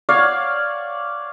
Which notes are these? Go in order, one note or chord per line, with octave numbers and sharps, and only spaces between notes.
C#5 D5 F5 F#5